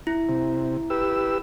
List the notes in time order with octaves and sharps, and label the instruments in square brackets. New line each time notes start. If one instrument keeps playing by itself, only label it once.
[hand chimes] E4
[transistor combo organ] C3
G4 B4 E6